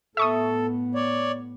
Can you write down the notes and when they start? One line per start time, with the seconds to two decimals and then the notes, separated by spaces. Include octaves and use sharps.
0.17 A2 B3 A4 E5 C#6 D#6
0.95 C#5 D5